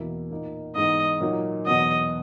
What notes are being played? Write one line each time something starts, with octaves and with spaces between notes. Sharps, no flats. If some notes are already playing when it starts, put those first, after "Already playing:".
Already playing: E2 B2 A#3 E4
A#2 A#3 D#4
G#2 E3 G#3 B3 D#4 D#5
A#2 F#3 A#3 D#4
E2 B2 F#3 B3 D#5